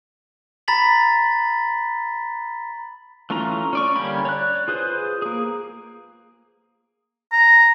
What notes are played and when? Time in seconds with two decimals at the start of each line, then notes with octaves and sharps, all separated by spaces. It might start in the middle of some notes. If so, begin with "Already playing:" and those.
0.68 A#5 B5 A6 B6 F#7
3.30 E3 A3 C#4 F4 A#5
3.73 C#4 D5 C#6
3.96 D3 G3 A#3 C#4 B5
4.25 C#5 D5 F#6
4.68 F4 G#4 B4 C5
5.22 A#3 G#4
7.32 A#5